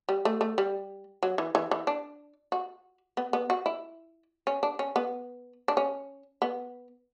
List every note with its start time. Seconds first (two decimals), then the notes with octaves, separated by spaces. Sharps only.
0.09 G3
0.25 A3
0.41 A3
0.58 G3
1.23 F#3
1.38 E3
1.55 E3
1.71 E3
1.87 D4
2.52 F#4
3.17 B3
3.33 B3
3.50 F#4
3.66 E4
4.47 C#4
4.63 D4
4.79 C#4
4.96 B3
5.68 D4
5.77 C#4
6.42 B3